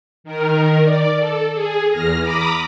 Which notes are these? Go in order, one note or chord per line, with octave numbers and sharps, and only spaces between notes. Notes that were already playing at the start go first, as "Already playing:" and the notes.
D#3 A#4
D5
A4
G#4
E2 F6 A#6
A#5 B5 D6 D#6